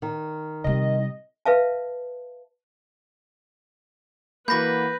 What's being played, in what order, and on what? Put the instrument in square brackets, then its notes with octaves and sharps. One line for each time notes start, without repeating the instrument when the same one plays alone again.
[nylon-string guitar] D#3
[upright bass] C3 G3 [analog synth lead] D#5
[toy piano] B4 E5 F5 A5
[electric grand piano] E3 A#3 [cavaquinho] F#4 B5 [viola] B4 [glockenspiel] G6 A#6